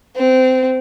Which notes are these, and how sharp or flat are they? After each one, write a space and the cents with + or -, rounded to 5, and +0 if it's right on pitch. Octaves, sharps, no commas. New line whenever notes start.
C4 -20